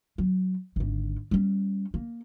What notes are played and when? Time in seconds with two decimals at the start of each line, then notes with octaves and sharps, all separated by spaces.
0.18 F#3
0.76 G#1 D3
1.31 G3 C#4
1.94 A#3